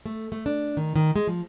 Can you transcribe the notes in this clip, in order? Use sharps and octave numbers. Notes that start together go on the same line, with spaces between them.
A3
A3
D4
D#3
D#3
G#3
F3